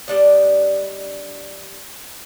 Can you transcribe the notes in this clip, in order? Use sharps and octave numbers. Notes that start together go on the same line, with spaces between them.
G3 D4 D#5